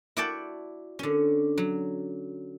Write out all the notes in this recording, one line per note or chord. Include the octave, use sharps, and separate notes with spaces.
E4 F#4 D5 F#5 G5 A5
D3 C#4
F#3